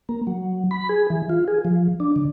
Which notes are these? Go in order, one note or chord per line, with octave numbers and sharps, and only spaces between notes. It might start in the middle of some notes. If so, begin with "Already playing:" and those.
A#3
F#3
B5
G#4
E3
F4
G#4
F3
D4
D3